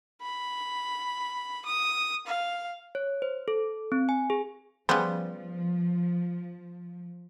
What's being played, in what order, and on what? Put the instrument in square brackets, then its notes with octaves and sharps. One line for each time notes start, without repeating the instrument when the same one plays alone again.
[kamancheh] B5
D#6
F5
[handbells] C#5
C5
A4
C4
G#5
G#4
[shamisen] C#3 C5 [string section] F3 [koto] G3 B3